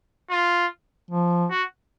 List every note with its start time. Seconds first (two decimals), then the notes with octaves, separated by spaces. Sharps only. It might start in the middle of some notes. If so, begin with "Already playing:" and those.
0.30 F4
1.11 F3
1.51 F#4